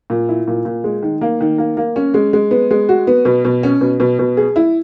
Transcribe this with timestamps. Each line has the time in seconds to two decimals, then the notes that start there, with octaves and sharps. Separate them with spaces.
0.10 A#2
0.29 E4
0.48 A#2
0.65 A#2
0.84 G#3
1.02 D#3
1.21 A#3
1.41 D#3
1.58 A#3
1.77 A#3
1.96 C#4
2.14 G#3
2.33 G#3
2.51 B3
2.71 G#3
2.89 F#4
3.07 B3
3.25 B2
3.45 B2
3.63 C#4
3.81 B2
4.00 B2
4.19 B2
4.37 G#4
4.56 E4